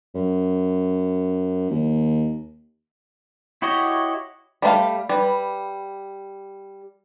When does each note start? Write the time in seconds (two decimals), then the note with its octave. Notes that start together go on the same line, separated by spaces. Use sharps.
0.15 F#2
1.70 D#2
3.62 E4 F#4 G4 C#5 D#5
4.62 G3 A3 C5 F5
5.09 G3 B4